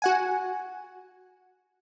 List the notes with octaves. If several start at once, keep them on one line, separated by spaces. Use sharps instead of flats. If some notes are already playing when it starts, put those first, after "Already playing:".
F#4 F#5 G#5